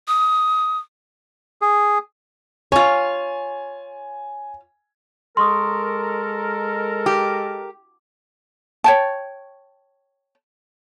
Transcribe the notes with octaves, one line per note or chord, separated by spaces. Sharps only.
D#6
G#4
F4 C#5 G#5
G#3 A4 A#4 C6 C#6 D#6
G4
C#5 G5 A5